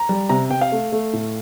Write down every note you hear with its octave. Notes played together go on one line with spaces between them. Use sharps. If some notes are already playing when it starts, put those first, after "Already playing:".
Already playing: A#5
G3
C3 A#5
C3 G5
F5
A3
A3
A2